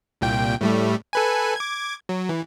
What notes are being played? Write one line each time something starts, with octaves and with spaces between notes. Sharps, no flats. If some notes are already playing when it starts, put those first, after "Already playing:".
C2 A#2 G5
A2 G3 A3
A4 B4 G#5
D6 G#6
F#3
E3